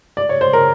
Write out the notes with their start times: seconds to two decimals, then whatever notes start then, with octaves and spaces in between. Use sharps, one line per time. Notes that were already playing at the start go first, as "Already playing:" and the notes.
0.17 D5
0.29 C#5
0.41 C5
0.53 A#4